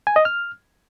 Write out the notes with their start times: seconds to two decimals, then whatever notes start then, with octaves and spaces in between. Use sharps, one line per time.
0.07 G#5
0.16 D#5
0.25 F6